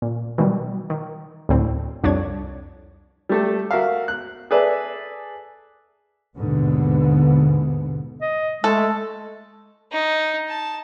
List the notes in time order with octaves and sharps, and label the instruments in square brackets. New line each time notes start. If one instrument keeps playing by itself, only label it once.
[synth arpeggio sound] A#2
B2 D#3 F#3 G3
D#3
D2 A2 C4
C2 F2 D4 C#5 G#6
[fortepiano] G3 A3 A4
F#4 A#4 E5 F5
F#6
G#4 A4 B4 D5 E5
[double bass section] D#2 G#2 B2 D3 B3
[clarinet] D#5
[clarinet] G#3 [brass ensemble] A3 [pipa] A4
[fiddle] D#4
A5